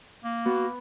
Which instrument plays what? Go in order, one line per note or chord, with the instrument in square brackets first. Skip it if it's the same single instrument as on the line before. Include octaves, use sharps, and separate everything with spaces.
[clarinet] A#3
[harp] B3 [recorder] F#4